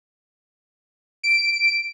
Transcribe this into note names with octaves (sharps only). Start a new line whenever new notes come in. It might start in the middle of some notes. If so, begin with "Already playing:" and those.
D7